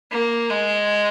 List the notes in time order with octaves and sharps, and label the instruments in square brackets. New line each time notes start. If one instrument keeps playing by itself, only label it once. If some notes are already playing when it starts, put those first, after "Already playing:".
[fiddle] A#3
G#3